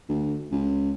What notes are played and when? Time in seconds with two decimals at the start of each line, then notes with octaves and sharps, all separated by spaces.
0.09 D2
0.51 C#2